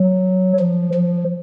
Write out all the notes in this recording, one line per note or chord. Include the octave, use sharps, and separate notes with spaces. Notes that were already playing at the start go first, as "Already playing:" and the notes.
Already playing: F#3
F3
F3